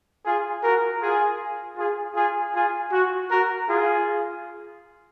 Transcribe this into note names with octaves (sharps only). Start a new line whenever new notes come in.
F4 G#4
F#4 A#4
F4 G#4
F4 G#4
F4 G#4
F4 G#4
F#4
F#4 A#4
F4 G#4